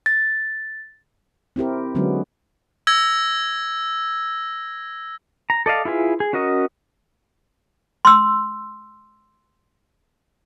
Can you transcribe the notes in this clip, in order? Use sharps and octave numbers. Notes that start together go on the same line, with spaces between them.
A6
C4 E4 G4 A#4
D3 F#3 G#3 B3 C#4
E6 G#6 A#6
A#5
A4 D5 D#5 F5
E4 F4 G#4 B4
G#4
C#4 F#4 A#4 D#5
C6 E6